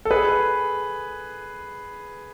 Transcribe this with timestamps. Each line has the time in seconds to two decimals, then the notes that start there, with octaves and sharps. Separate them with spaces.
0.05 A4
0.11 G#4 B4